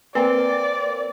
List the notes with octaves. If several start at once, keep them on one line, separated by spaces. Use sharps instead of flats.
A#3 C4 B4 D5